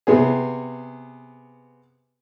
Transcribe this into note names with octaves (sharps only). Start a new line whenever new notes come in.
C3 B3 G#4